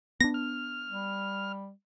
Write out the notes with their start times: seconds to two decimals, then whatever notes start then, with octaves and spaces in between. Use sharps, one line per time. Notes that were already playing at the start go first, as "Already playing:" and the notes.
0.20 B3 D4 A#6
0.34 F6
0.88 G3